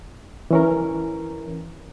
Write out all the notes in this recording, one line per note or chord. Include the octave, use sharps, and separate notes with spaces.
E3 C#4 A#4